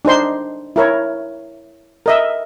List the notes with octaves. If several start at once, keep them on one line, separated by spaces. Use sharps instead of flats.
D4 D#4 C5 C6
E4 A#4 C#5
A#4 D#5 E5